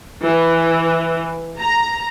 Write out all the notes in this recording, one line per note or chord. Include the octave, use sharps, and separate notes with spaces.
E3
A#5